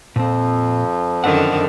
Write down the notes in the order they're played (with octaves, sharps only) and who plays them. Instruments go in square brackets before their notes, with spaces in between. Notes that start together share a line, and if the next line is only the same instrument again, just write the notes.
[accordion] F2 F3 [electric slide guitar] A#2 C4
[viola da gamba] F#2 D3 D#3 [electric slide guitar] F#5